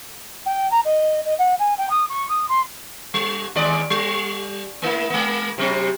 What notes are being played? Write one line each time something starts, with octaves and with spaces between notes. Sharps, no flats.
G5
A#5
D#5
D#5
F#5
G#5
G5
D#6
C#6
D#6
C6
G3
D#2 G#3 D5
G3
A3 A#3 E4
G#3 A#3
C3 F#3 C4